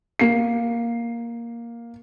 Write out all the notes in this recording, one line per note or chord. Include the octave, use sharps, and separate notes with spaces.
A#3 C7